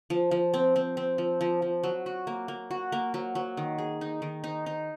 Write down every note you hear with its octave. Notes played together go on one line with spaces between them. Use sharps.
F3
F3
C4
C4
C4
F3
F3
F3
F#3
F#4
A#3
A#3
F#4
A#3
F#3
F#3
D#3
G#4
D#4
D#3
D#4
D#4